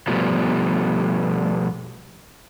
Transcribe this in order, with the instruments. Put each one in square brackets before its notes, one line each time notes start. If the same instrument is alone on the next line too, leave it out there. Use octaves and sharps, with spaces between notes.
[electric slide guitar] B2 F3 G3 A3